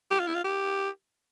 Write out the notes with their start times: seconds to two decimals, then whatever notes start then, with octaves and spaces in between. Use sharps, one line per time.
0.11 G4
0.20 F4
0.27 E4
0.35 F4
0.44 G4